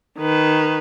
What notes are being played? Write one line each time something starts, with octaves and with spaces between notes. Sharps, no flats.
D#3 B4